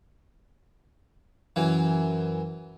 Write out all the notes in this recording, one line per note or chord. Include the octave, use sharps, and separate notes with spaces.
F#2 E3